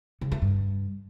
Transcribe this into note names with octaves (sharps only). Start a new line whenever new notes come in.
C#3
A3
G2